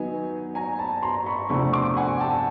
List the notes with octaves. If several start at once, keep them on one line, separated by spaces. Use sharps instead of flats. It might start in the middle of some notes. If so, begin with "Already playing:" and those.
Already playing: D#3 F#3 B3 D#4 G#5
G#5 A#5
A5 B5
A#5 C6
B5 C#6
E2 C3 F3 A3 D4 B5 C#6
C6 D6
F#5 G#5
G5 A5